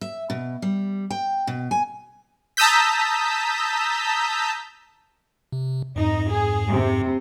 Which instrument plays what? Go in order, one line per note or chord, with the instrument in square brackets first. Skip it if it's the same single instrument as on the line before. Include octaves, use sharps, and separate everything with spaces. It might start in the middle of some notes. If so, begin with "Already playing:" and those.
[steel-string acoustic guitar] E5
B2
G3
G5
B2
G#5
[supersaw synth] A5 A#5 D#6 E6 G6 B6
[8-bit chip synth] C3
[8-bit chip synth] F2 G#2 [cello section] D#4
[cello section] G#4
C3